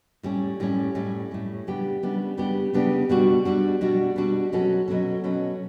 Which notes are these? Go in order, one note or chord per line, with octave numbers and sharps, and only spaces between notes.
A2 G3 C#4
A2 G3 C#4
A2 G3 C#4
A2 G3 C#4
C#3 G3 B3 D4 G4
C#3 G3 B3 D4 G4
C#3 G3 B3 D4 G4
C#3 G3 B3 D4 G4
B2 G3 D4 F#4
B2 G3 D4 F#4
B2 G3 D4 F#4
B2 G3 D4 F#4
B2 F#3 C#4 F#4 A4
B2 F#3 C#4 F#4 A4
B2 F#3 C#4 F#4 A4